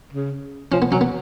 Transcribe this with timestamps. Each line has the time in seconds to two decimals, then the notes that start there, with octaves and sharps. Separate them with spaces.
0.13 C#3
0.72 F3 C#4
0.82 B3
0.92 F#3 C#4
1.01 B3